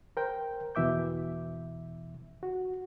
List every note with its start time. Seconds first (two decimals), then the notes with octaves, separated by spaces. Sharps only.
0.17 A#4 C5 G5
0.75 E2 B2 E3 E5 D6 G6
2.43 F#4